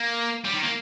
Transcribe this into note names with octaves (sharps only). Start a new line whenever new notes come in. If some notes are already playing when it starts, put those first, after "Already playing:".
Already playing: A#3
G3
D#3
A#3